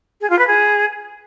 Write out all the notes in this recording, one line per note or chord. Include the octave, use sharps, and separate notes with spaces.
G#4
F4
B4
G#4